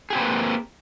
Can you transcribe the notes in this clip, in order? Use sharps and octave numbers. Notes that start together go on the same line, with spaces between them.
A#3 C4 G4 G#4 B4